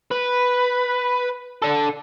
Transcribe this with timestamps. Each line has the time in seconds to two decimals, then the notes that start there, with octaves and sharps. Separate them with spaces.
0.11 B4
1.62 D4 A4